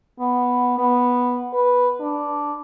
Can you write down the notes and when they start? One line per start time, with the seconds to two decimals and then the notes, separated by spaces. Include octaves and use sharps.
0.19 B3
0.78 B3
1.53 B4
2.01 D4